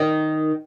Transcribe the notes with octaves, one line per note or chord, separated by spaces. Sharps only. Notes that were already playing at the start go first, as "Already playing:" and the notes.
Already playing: D#3